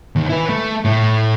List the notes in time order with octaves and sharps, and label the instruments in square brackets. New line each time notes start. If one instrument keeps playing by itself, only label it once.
[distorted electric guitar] D#2
E4 B4
A3
A2